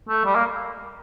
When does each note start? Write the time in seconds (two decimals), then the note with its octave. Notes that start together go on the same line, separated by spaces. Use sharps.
0.09 A3
0.25 G3
0.36 A#3